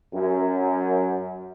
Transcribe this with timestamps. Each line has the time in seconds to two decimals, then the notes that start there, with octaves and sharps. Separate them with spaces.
0.14 F#2